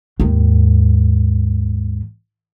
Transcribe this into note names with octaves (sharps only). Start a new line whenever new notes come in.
D#2 G#2